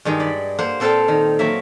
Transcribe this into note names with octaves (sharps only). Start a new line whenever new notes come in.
G2 D#3 G#3
D5 B5
A#3 C5 F#5
A#2 C4 A4 F5 G5 A5
D#3
F#3 A#3 E5